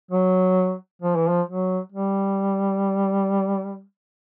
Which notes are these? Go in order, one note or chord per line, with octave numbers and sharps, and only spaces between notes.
F#3
F3
E3
F3
F#3
G3